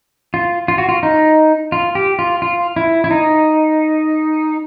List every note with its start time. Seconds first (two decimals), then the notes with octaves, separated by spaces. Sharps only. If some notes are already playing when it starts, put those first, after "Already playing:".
0.34 F4
0.68 F4
0.78 F#4
0.89 F4
1.03 D#4
1.72 F4
1.95 G4
2.19 F4
2.42 F4
2.76 E4
3.04 E4
3.11 D#4